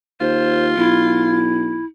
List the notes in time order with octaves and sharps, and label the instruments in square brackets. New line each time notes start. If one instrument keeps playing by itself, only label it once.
[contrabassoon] D#2 [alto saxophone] F4 [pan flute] C5
[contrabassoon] B1 [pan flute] E4